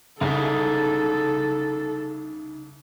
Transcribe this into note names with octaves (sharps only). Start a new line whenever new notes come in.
C2 C#3 D#4 G#4 A4 E5